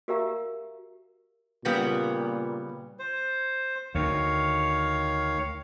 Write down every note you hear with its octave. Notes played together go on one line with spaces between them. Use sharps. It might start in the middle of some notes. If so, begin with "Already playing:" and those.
F#4 G4 A#4 E5 F5 A#5
A#2 C#3 G3 B3
C5
D2 D#3 C#5 F5